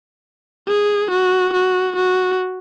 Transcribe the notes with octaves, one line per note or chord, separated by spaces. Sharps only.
G#4
F#4
F#4
F#4